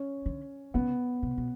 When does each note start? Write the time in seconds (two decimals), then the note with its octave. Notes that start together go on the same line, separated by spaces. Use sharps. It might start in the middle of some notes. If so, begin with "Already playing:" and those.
Already playing: C#4
0.26 D3
0.74 C#3 B3
1.23 C3
1.37 B2